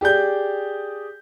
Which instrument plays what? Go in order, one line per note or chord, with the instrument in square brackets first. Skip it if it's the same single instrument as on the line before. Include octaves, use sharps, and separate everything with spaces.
[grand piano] G4 G#4 D5 G6